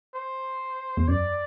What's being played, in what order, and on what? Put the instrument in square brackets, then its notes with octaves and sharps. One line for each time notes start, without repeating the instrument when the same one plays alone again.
[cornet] C5
[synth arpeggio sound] E2
[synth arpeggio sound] F#2 [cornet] D5